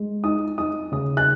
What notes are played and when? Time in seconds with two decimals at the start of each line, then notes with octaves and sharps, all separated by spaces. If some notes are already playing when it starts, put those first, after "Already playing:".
Already playing: G#3
0.24 D#4 D#6
0.58 D#4 D#6
0.92 C#3 D#6
1.17 F#6